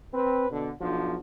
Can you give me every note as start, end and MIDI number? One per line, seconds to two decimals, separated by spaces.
0.13 0.46 60
0.13 0.46 71
0.50 0.72 47
0.50 0.72 50
0.81 1.16 35
0.81 1.16 53
0.81 1.16 62
0.81 1.16 66